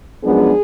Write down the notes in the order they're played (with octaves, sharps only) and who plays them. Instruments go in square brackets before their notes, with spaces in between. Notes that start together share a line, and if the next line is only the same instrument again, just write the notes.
[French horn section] F#2 F3 G#3 B3 D4 G#4